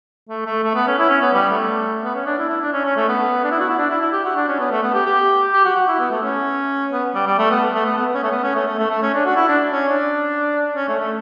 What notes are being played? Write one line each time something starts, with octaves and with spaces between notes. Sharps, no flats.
A3
A3
A3
B3
C#4
E4
C#4
B3
G3
A3
B3
C#4
D4
E4
E4
D4
C#4
C#4
A3
B3
D4
E4
F#4
E4
D4
E4
E4
G4
F#4
D4
C#4
B3
A3
B3
G4
G4
G4
F#4
F#4
E4
B3
A3
C#4
B3
G3
G3
A3
B3
A3
B3
B3
C#4
A3
B3
C#4
A3
A3
A3
A3
C#4
D4
F#4
E4
D4
C#4
D4
C#4
A3
A3